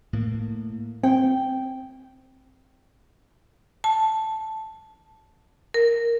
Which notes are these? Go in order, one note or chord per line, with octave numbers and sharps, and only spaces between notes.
A2 A#3
C4 G5
A5
A#4